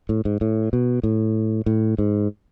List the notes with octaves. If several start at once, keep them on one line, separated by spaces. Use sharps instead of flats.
A2
G#2
A2
B2
A2
A2
G#2